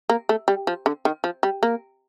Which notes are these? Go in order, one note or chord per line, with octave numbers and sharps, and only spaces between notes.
A#3
A3
G3
F3
D3
D#3
F3
G3
A#3